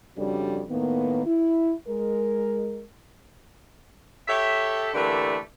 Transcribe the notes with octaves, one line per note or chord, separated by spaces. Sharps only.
F2 C#3 G3 D4 F#4 A4
A2 D#3 A#3 B3
E4
G#3 A#4
G4 A4 C#5 E5
D3 E3 A3 A#3 G4 D5